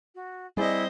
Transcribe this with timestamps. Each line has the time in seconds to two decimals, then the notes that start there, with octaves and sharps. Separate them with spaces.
0.15 F#4
0.57 G3 B3 C4 E4 G#4 C5 D5 D#5